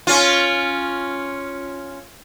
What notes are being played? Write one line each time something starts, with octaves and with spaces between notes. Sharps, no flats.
C#4 F4